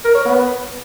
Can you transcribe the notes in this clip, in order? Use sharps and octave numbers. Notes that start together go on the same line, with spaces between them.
A#4
C#5
B3